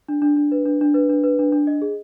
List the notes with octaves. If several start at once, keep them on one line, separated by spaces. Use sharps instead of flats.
D4
D4
D4
B4
D4
D4
B4
D4
B4
D4
D4
D#5
G#4